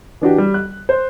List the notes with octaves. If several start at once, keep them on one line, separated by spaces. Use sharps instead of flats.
E3 D4 F#4 G4
G3
F#6
C5